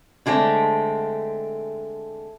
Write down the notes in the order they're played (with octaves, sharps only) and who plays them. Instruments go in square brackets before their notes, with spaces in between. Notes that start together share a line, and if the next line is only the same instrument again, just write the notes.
[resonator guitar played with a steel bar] D3 G#3 A3 C4